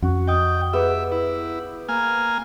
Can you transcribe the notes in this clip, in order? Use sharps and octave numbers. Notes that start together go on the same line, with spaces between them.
F2 C#4 F#4
D#5 G5 D#6
B3 G4 G#4 B4 E5
E4
A#3 G#5 F6